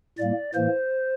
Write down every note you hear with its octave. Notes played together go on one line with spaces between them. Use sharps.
A2 G3 A#3 D5
A2 E3 A#3 C5